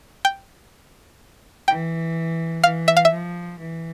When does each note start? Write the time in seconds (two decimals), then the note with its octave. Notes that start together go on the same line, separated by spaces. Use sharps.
0.25 G5
1.68 E3 G5
2.64 E3 F5
2.88 E5
2.97 F5
3.05 E5
3.12 F3
3.59 E3